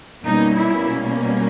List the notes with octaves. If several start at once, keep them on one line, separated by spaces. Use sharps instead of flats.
B2 G3 A#3 C#4 D#4
E4